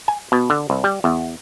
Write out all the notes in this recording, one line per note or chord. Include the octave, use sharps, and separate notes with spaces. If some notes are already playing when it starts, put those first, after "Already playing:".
G#5
B2
D3
C2
G3
E2